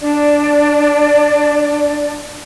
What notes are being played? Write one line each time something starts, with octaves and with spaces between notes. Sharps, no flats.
D4 D5